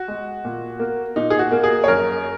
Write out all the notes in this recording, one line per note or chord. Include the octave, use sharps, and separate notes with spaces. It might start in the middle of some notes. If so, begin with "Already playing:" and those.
Already playing: F#4
G#3
A#2
A#3
A#2 D#4
G#4
F#4
A#3
G#4
C#5
F#2 A#4